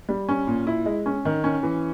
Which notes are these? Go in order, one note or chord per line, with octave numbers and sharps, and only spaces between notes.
G3
C#4
A#2
E4
G#3
C#4
D#3
C#4
E3